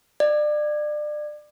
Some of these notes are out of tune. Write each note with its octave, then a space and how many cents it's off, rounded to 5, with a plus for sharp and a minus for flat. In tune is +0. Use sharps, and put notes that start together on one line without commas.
D5 +30